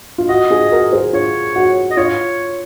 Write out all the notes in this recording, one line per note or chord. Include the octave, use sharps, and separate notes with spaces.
F4
F#4 D#5
F4 G#4
F#4 A#4
G#4 C5
F4 C#5
F#4
D#5
F4 C#5